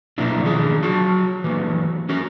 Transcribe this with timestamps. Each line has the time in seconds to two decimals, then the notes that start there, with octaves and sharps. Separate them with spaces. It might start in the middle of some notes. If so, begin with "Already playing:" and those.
0.18 B2 F3 F#3 A#3 D4 E4
0.43 D#3 F3 D4 G#4
0.83 F#3 F#4 A5
1.44 E3 F#3 A#3
2.09 C#4 F#4 A#4